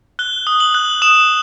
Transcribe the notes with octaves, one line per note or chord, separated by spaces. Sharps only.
F#6 G7
D#6
F#7
F#6
D#6 E7